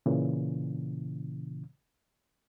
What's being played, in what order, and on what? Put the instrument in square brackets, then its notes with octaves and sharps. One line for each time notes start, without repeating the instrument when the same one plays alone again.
[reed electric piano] A#2 C#3 E3